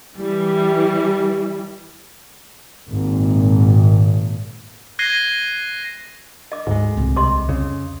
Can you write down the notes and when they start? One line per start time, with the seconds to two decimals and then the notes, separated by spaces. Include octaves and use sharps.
0.17 E3 G3
2.90 G#1 A#2
4.99 F#6 G#6 A#6 C7 D#7 G7
6.52 D#5 D6
6.67 D2 G#2 G#3
6.97 C2 E3
7.16 C3 D#5 C6 D6
7.49 F2 C#3